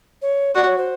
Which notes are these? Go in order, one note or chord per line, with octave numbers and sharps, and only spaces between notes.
C#5
F#4 D5
C#5
C5